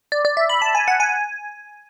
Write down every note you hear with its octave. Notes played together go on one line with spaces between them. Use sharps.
D5
D5
E5
B5
A5
G#5
F#5
G#5